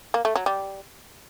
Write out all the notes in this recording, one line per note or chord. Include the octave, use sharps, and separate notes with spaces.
A#3
A3
F#3
G3